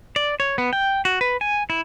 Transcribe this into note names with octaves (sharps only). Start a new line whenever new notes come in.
D5
C#5
B3
G5
F#4
B4
G#5
E4